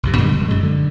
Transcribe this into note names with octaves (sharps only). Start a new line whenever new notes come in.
B1 F#2 C3
A#2 D3 G3 G#3
F1
F#2 G#3
D3